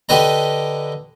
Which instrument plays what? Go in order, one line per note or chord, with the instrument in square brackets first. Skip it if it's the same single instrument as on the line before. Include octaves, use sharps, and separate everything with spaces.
[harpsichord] D3 G4 B4 D#5 A#5